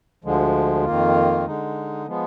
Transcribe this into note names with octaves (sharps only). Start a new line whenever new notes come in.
D2 D3 F3 G#3
F2 D#3 A#3 F4
D3 G#3 D#4
F3 G#3 B3